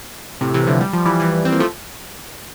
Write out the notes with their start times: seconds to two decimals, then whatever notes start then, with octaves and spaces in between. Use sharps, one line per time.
0.41 A2 C3
0.54 C3 E3
0.67 D3 F3
0.81 G3
0.93 F3
1.05 E3 G3
1.20 E3 G3
1.45 C4
1.52 A#3
1.60 F3 A3